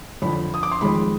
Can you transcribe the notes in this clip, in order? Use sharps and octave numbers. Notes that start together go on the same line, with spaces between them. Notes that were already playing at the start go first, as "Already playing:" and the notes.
F2 D3 F3 B5
D#6
D6
C6
F2 D#3 G#3 B5